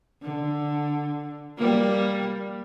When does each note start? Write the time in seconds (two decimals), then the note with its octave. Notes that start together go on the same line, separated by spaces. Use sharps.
0.23 D3
1.57 G3 A#3